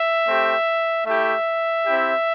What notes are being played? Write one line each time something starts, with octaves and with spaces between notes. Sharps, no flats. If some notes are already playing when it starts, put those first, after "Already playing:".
Already playing: E5
A3 C4 G4
A3 E4 G4 E5
C4 E4 G4